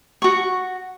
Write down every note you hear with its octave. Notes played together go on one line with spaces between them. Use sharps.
F#4 C#6